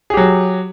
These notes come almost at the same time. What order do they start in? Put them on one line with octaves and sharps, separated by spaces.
G#4 G4 F#3